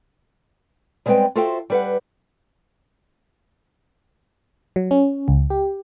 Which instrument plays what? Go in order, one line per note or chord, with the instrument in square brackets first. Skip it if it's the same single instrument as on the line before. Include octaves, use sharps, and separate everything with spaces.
[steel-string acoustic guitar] G3 G#3 B3 C4 B4 G5
F4 F#4 A4 C5 E5 G5
G3 B4 F#5
[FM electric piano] F#3
C#4
C#2
G4